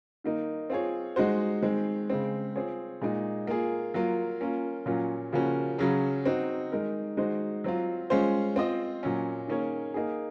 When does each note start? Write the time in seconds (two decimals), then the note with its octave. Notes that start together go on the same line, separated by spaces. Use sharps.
0.24 D#3 A#3 D#4
0.70 C4 F4 G#4 C#5
1.16 G#3 D#4 F#4 C5
1.62 D#3 G#3 C4
2.10 C#3 G#3 C4
2.56 C4 F4 G#4 C#5
3.01 A#2 G#3 D#4
3.47 A#3 F4 G#4
3.94 F#3 A#3 F4
4.41 A#3 C#4 F4
4.86 A#2 F#3 C#4 F4 A#4
5.32 C#3 F3 A#3 C#4 F#4
5.79 C#3 F#3 C#4 G#4
6.26 C4 D#4 F#4
6.72 D#3 G#3 D#4 A#4
7.17 D#3 G#3 D#4 F#4 C5
7.64 F#3 C4 F4
8.10 G#3 C#4 F4 C5
8.56 C4 F4 C5 D#5
9.03 A#2 F#3 C#4
9.48 D#3 A#3 C#4 G#4 C#5
9.94 A#3 D#4 G#4